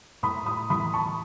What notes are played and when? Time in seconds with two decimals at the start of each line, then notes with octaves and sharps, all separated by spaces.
0.23 A2 B5 D#6
0.46 B5 D#6
0.70 E3 B5 D#6
0.93 A5 C#6